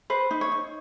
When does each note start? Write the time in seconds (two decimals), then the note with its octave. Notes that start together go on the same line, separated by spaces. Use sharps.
0.10 B4 C5
0.31 D#4
0.41 C#5
0.52 D#4